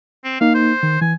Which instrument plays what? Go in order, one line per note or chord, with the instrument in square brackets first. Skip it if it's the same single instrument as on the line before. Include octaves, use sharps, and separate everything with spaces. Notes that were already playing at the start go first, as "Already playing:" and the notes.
[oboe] C4
[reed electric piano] A#3 D#4 [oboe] F5
[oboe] C5
[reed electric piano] D#3
[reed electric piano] E3 [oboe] G#5